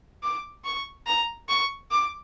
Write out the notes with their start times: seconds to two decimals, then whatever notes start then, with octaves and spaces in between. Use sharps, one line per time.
0.22 D6
0.65 C#6
1.06 A#5
1.49 C#6
1.91 D6